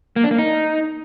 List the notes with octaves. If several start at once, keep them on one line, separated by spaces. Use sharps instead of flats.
A#3
D4
A#3
D#4